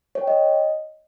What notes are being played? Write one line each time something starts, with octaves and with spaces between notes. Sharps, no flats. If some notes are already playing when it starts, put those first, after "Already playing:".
C#5
G5
D#5